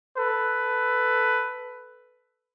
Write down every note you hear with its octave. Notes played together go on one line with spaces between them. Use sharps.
A4 B4